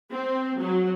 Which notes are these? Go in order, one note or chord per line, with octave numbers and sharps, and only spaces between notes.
C4
F#3